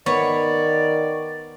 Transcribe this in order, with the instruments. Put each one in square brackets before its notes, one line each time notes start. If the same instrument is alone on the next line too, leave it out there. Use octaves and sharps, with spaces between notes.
[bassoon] D#3 [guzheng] B3 [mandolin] C#5 [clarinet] D5